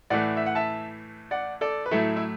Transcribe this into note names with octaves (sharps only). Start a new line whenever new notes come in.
A2 E3 A3 D5 F#5
E5
F#5
E5 A5
D5 F#5
A4 D5
B4
A2 F#3 A3 E4 A4
E4